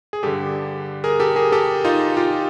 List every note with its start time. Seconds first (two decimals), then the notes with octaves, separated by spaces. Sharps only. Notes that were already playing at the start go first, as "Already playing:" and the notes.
0.13 G#4
0.23 G2 D3 G4 A4
1.04 G#4 A#4
1.20 G4 A4
1.36 G#4 A#4
1.52 G4 A4
1.85 D#4 F4
2.17 F4 G4